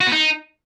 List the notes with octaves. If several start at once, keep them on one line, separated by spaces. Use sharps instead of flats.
F#4
B3
D#4